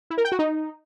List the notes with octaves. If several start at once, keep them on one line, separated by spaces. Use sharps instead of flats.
E4
A#4
G5
F#4
D#4